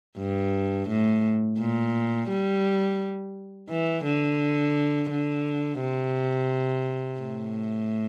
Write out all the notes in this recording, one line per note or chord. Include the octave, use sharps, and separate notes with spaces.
G2
A2
A#2
G3
E3
D3
D3
C3
A2